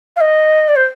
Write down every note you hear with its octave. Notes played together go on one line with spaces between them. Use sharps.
F5
D#5
D5
C5